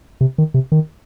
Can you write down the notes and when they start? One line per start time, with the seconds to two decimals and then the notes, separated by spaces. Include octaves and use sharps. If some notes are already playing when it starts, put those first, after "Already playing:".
0.21 C3
0.38 D#3
0.54 C3
0.72 D#3